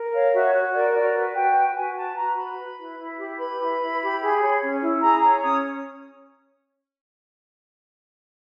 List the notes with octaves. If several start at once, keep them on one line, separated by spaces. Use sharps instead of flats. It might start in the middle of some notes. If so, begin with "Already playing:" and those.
Already playing: A#4
C#5 F5
F#4 E5
F#4
A#4 D5
F#4 D5
B4
F#4 G5
B4
F#4 G#5
B4 A5
F#4 A#5
B4 B5
B4
E4
E4
G4
B4 B5
E4
E4
G4
G#4
C#5
C#4
E4
G#4 A#5
C#5 A#5
C#4 D#6